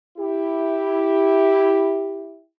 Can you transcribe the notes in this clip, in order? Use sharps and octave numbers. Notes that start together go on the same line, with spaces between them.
E4 G4